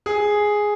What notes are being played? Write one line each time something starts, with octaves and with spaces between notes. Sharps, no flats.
G#4